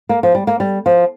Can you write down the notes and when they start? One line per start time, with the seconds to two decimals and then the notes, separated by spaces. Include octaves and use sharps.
0.09 A#3
0.23 F3
0.35 G3
0.47 A#3
0.60 G3
0.86 F3